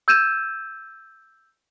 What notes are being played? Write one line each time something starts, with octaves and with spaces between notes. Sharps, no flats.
E6 G6 G#6 D#7 E7